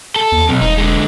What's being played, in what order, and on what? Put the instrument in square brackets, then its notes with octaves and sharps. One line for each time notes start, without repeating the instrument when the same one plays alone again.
[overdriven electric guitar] A4
[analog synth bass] E2
[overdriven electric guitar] B1 [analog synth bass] C4
[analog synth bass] E1 [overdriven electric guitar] D#4
[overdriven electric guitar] D3 G#3